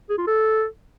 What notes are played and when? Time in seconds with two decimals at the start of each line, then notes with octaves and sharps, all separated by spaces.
0.10 G#4
0.18 F4
0.27 A4